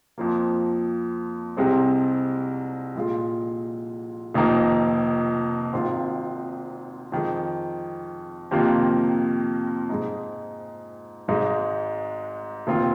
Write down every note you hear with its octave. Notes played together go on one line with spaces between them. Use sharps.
F2 F3 A#3
C2 C3 G#3 C4
A#1 A#2 G#3 F4
F1 F2 D#3 A#3 D#4
G#1 G#2 D#3 C4 F4
F2 D#3 G#3
F2 C3 D#3 A#3 F4
G#2 G#3 D#4
G#1 G#2 G#3 D#4
F1 D#2 D#3 C4 F4